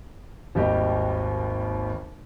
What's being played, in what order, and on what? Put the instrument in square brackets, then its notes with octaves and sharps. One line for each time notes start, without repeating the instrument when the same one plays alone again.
[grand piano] G#1 D#2 G3 G4 D#5 G5